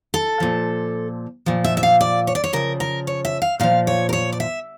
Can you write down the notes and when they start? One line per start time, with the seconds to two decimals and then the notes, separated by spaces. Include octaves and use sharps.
0.14 A4
0.40 A#2 F3
1.46 A#2 F3
1.64 E5
1.77 E5
1.83 F5
2.01 D5
2.27 C#5
2.35 D5
2.44 C#5
2.53 C#3 F3 A#4
2.80 A#4
3.07 C#5
3.25 E5
3.42 F5
3.60 A#2 F3 F5
3.87 C#5
4.09 A#4
4.13 C#5
4.32 D5
4.40 E5